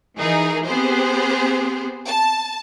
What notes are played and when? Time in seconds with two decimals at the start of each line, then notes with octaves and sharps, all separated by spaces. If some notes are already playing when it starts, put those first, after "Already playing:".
0.17 E3 D#4 G#4 A#4
0.65 B3 C4 G4 G#4 C5
2.07 A5